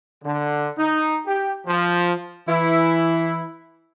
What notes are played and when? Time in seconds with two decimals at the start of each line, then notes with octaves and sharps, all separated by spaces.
0.24 D3
0.78 D#4
1.26 G4
1.67 F3
2.47 E3 E4